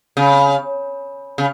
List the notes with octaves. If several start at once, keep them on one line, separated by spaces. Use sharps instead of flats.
C#3
C#3